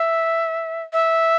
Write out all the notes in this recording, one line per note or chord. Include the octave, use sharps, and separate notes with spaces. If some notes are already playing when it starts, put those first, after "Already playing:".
Already playing: E5
E5